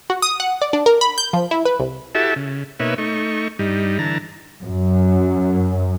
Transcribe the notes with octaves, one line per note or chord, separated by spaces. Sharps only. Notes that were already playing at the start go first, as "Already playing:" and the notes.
F#4
D#6
F#5
D5
D4
A#4
B5
G6
F3
E4
B4
C2
E4 F#4 G4 A4 E5 A5
C#3
B2 A#3 D#4 B4 C#5 E5
A3 D#4 C#6
G2 G3 D#4
D3 E3 A5 A#5
F#2